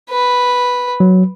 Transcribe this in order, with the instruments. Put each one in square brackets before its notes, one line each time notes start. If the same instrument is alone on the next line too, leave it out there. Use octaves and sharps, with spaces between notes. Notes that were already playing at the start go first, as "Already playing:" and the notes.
[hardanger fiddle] B4
[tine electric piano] F#3